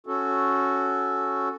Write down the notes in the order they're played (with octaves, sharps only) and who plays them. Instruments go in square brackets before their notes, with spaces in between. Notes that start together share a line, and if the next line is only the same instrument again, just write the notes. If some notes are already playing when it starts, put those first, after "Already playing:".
[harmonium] C#4 F#4 A4